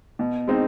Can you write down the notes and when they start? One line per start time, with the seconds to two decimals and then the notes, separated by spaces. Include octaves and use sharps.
0.19 B2
0.47 G#3 C4 D#4